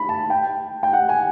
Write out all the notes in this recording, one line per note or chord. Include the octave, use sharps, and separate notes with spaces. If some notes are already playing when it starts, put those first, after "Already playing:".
Already playing: B5
A5
G5
G5
F#5
G#5